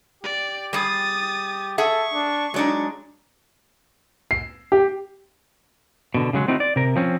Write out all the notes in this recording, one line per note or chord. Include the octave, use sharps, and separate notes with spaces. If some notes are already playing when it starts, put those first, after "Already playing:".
G4 D5
G3 G#4 D#6 A6
G#4 A4 E5 F#5 C#6
D4
F#3 G#3 D4 D#4
C7
G4
B2 D3
C#3 F3 F#3 G#3
A3 C4 D#4 E4 F#4
D5
C3 A#4
F3 C4 C#4